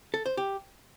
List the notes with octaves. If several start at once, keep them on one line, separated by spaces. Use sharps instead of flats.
A4
C5
G4